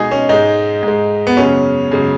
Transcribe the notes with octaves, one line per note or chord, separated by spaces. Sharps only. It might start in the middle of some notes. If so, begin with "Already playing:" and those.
Already playing: B2 G#3 D#4 G#4
C#4
G#2 G#3 D#4
G#2 G#3
B3
F#2 C#3 G#3 C#4
F#2 C#3 G#3